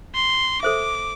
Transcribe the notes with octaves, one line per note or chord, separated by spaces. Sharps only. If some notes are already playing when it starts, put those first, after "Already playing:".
C6
A4 C5 E5 D6